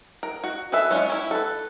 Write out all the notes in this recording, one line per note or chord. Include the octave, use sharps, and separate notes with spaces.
A#4
F#4
F#4 G#4 A4 B4 E5
F#3 G#3 C#4 D4 F4
C#4 E4
A4 B4